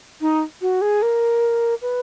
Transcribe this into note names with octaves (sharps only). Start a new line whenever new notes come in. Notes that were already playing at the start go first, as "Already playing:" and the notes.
D#4
F#4
G#4
A#4
B4